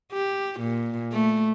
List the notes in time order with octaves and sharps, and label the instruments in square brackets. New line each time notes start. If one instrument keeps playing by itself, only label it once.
[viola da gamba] G4
A#2
A3